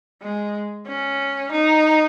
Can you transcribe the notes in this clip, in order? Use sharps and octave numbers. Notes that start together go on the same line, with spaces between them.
G#3
C#4
D#4